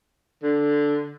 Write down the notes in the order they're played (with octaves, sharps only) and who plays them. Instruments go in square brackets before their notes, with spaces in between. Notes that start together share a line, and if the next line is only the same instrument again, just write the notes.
[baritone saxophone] D3